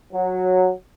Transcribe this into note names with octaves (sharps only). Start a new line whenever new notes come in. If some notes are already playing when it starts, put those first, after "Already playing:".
F#3